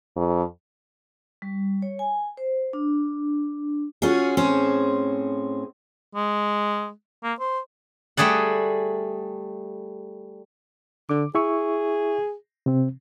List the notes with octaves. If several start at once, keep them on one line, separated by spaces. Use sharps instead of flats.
F2
G3
C#5
G#5
C5
D4
C#4 F4 F#4 G#4
A2 C4 C#4 G#4 C5
G#3
A#3
C5
G3 A3 G#4 D5 F#5
D3 D6
E4 G#4 E5 C#6
C3 C4